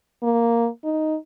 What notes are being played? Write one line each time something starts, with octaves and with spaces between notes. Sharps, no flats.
A#3
D#4